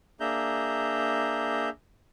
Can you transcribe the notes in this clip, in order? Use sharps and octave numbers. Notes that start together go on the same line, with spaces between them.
A#3 D4 G#4 E5 A#5 G6